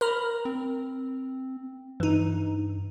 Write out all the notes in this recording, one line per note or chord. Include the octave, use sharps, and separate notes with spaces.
A#4 A#5 B5
C4
G2 E3 D#4